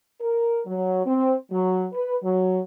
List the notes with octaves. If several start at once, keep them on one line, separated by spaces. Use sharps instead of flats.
A#4
F#3
C4
F#3
B4
F#3